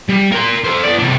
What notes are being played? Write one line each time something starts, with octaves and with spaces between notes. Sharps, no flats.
G3
A#4 C6
A4 C5
B3 D5
C3 D4